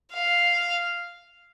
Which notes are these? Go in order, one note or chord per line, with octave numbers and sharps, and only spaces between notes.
F5